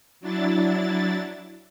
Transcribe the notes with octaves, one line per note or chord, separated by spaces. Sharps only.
F#3 D4 E4 A6